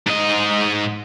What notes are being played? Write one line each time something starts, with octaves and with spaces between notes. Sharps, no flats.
G#2 D#5